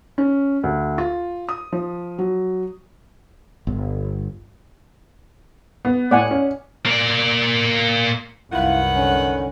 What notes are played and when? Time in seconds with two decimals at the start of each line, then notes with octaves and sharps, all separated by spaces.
0.18 C#4
0.63 D2
0.98 F4
1.49 D#6
1.73 F3
2.18 F#3
3.67 G1
5.85 B3
6.11 A2 D5 F#5 G#5
6.31 C#4
6.86 A#3 D5
8.52 C2 F#2 D#3 E4 F4 B4 F#5
8.93 D3 C#4